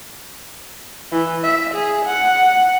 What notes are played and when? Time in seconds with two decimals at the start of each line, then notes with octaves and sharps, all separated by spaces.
1.12 E3
1.43 E5
1.74 G#4
2.06 F#5